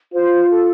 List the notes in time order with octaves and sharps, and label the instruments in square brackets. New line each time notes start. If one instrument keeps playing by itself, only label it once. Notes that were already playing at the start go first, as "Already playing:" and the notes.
[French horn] F4 [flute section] C5
[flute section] A4